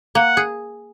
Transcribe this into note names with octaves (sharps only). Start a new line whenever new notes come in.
A#3 F#5
G#4